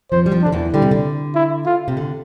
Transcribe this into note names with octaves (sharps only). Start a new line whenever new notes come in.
F2 F3 C5
G3
F2 F3
D4
D3
E2 E3
D3 G3
C3
D3
E4
F4
C3
D3